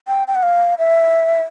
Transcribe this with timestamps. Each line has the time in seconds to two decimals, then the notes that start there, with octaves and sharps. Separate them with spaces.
0.08 G5
0.28 G5
0.35 F#5
0.43 F5
0.79 E5